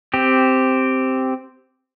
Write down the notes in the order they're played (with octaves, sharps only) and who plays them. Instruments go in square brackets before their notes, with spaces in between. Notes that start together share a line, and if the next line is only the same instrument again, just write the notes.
[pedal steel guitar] C4 G4